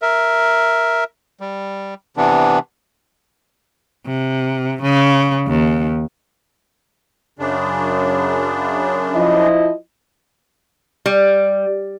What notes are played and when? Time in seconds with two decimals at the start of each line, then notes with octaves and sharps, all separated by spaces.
0.02 A#4 E5
1.41 G3
2.17 C3 E3 B3 D4
4.07 C3
4.82 C#3
5.47 D#2
7.39 F#2 C#3 D4
9.15 F3 E4 D#5
11.06 G3